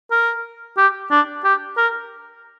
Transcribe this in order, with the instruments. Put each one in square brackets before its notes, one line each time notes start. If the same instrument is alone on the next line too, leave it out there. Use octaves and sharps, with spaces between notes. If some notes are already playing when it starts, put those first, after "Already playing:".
[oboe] A#4
G4
D4
G4
A#4